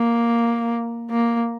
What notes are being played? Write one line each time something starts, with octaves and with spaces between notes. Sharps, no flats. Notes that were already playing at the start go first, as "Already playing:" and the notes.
Already playing: A#3
A#3